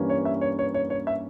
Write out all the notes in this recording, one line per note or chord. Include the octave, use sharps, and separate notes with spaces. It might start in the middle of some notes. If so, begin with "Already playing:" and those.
Already playing: G2 E3 G3 A#3 C#4
C#5
E5
C#5
C#5
C#5
C#5
E5